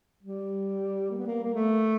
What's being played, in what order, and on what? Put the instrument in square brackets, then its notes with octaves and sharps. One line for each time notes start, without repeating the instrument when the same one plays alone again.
[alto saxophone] G3
A#3
B3
A#3
A#3
A3